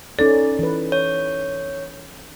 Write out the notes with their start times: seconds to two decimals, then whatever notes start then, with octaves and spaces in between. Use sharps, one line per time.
0.19 C#4 D#4 A4 D5
0.59 E3 B4
0.92 C#5